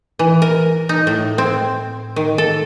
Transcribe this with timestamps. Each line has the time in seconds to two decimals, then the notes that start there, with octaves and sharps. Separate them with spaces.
0.19 E3
0.42 A#4
0.89 D#4
1.07 A2
1.38 C4
2.16 D#3
2.38 A4